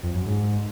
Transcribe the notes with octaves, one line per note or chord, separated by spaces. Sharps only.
F2
F#2
G#2